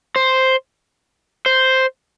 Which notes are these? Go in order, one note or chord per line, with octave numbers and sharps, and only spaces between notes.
C5
C5